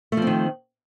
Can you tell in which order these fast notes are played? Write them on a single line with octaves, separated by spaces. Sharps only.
A3 F3 C4 D#3